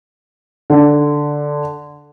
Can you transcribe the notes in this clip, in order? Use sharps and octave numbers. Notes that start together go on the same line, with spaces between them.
D3